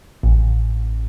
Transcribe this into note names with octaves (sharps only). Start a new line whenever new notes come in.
A1